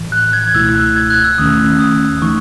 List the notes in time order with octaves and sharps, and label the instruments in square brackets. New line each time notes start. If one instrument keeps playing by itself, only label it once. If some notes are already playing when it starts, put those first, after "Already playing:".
Already playing: [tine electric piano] A1 A2 E3
[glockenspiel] F#6
G#6
[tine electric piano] C#2 B2 A3 E4 [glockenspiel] E6
[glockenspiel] F#6
G#6
F#6
E6
[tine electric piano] D#2 D#3 A3 C#4 [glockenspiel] D#6
[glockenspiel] D#6
[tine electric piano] E3 A3 D#4 [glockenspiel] C#6